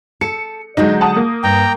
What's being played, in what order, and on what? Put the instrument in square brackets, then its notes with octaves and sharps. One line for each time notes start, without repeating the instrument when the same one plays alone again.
[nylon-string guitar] A4 [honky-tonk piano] C#7
[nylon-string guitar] D3 F#3 G#3 [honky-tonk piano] D#4 G6
[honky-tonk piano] F#5 A5 D#6
A#3
[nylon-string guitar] G2 [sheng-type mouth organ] G5 A#5